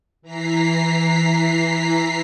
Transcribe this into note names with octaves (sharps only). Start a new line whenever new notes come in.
E3 A#5 B6 C7